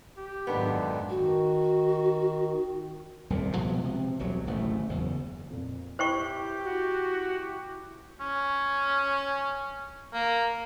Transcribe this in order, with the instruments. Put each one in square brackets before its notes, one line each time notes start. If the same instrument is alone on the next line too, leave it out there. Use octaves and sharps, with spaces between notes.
[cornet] G4
[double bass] G#1 F#2 [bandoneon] A#2 D3 D#3 [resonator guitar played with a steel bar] B3 D4
[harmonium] D#3 [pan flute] F#4
[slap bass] D#1 C2 F2 A#2
B2 F3 G#3 B3
C3
E1 C2 C3 F#3
D1 A1 D#2 A3
F#1 E2
[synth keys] F2 A#2
[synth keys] E4 [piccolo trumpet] G4 [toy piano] C5 G5 C#6
[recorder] F#4
[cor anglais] C#4
A#3